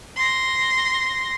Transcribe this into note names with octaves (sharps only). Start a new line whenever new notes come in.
C6 A#6